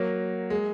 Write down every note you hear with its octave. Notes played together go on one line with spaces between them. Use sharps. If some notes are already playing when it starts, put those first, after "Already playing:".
Already playing: F#3 A#3
G#3